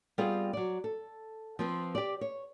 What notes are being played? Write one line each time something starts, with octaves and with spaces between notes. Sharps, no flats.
G3 B3 C4 F4 G#4
F#3 D5
A4
F3 C4 B4
G4 D5
C#5